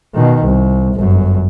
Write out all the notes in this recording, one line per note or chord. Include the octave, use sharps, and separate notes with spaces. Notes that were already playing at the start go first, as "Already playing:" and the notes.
B2 D#3
C2
G1 F#2